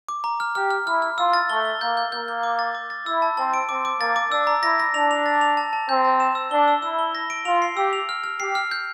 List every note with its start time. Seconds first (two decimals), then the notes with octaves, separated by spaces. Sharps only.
0.08 D6
0.24 A#5
0.40 F6
0.55 G4 F6
0.71 F6
0.87 E4 F6
1.02 F6
1.18 F4 E6
1.33 A6
1.50 A3 G7
1.65 G7
1.81 A#3 G6
1.97 G6
2.12 A#3 G6
2.28 G6
2.43 D6
2.59 A6
2.75 D6
2.90 A6
3.06 E4 E6
3.22 A5
3.37 C4 A5
3.54 D7
3.69 C4 D6
3.85 D6
4.00 A#3 A6
4.16 D6
4.32 D4 E6
4.47 A#5
4.63 E4 A#6
4.80 A#6
4.94 D4 F7
5.11 F7
5.26 A6
5.41 F7
5.57 A5
5.73 A5
5.88 C4 G6
6.05 A5
6.20 E7
6.35 E6
6.51 D4 G7
6.68 E6
6.82 E4 E6
6.99 G7
7.15 A#6
7.30 D7
7.45 F4 F7
7.62 C7
7.76 G4 E6
7.93 F7
8.09 F6
8.24 F6
8.40 G4 C7
8.55 F6
8.71 G6